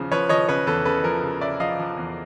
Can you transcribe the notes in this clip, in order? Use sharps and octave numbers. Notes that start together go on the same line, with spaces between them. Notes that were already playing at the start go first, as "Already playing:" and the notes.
Already playing: E2 C#3 F3
F3 B4 C#5
F3 C#5 D#5
C#3 B4 C#5
E2 A4 B4
C#3 A4 B4
F3 A#4
C#3
C#3 D5 E5
F3 D#5 F5
F3
E2